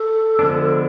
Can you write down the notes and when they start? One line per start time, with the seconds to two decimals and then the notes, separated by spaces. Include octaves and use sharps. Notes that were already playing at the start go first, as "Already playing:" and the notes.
Already playing: A4
0.39 D3 F3 G#3 B3 D4